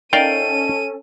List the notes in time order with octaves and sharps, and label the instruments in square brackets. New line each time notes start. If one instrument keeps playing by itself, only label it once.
[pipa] D#3 [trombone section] C#4 A4 [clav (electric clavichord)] D5 F5 G5 [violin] D#7